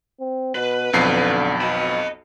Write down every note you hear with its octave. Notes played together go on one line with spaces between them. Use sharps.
C4
B2 B4
B1 F2 D3 C7
B2 D#5 B5